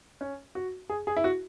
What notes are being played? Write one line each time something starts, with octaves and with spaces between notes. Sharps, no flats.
C#4
F#4
G#4
G#4
E4
F#4